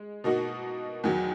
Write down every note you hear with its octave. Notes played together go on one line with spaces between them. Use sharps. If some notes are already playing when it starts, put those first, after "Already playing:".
Already playing: G#3
B2 A#3 D#4 F#4
E2 D#3 F#3